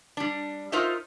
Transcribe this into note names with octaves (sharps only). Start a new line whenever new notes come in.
G3 D4
D#4 F4 A#4 C5 D#5 E5